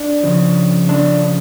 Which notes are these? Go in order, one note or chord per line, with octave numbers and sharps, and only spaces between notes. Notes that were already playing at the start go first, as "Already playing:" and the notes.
Already playing: D4
C#3 F3
C#3 F3 D4